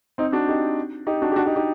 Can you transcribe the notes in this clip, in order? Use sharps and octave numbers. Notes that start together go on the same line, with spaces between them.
C4 D#4
D4 F#4
D#4 G4
D#4 G4
D4 F#4
G4
D4 F#4
D#4 G4
D#4 G4